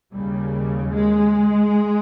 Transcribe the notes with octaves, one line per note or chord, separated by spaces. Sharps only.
D#2 C#3 G3
G#3